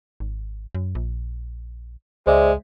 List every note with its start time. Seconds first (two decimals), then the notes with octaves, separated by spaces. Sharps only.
0.20 G#1
0.75 F#2
0.95 A#1
2.27 C#2 G#3 C5 D5 E5